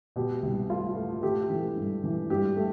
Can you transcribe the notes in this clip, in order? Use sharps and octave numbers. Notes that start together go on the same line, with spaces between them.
B2 G4
C2
A3 F4
A3
A3 G4
E3
G2
E3
G2 G4
A3